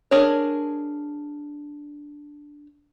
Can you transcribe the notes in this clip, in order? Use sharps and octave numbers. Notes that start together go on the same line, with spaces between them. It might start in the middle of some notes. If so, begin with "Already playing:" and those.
D4 G#4 A#4 C#5